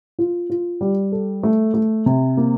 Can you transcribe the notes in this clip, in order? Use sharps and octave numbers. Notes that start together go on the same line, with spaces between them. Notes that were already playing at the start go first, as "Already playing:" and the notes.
F4
F4
G3
A4
A3
A3
C3
A#3